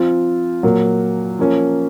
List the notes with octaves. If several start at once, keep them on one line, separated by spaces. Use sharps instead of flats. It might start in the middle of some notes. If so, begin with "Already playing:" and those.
Already playing: F3 C4 F4
A#2 F#3 A#3
F3 A#3 C#4